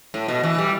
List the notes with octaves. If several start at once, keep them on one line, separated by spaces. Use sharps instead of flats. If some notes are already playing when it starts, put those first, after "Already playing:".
A2
B2
E3
G3